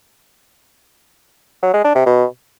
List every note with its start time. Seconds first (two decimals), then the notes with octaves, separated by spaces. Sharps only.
1.63 F#3
1.74 G#3
1.84 D4
1.95 C3
2.06 B2